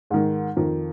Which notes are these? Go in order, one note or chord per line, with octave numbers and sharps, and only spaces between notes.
G#2 D#3
F2 D#3